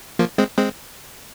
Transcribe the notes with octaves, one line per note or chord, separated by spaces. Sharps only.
F3 A#3
G#3 C4
G#3 C4